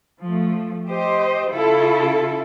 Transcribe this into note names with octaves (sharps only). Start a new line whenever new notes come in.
F3 A3
G4 C5 D#5
C#3 E4 F4 A4